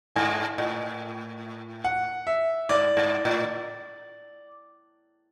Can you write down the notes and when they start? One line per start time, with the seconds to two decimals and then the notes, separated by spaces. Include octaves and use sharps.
0.16 G#2 G#5
0.58 A2
1.84 F#5
2.27 E5
2.69 G#2 D5
2.97 G#2
3.25 A2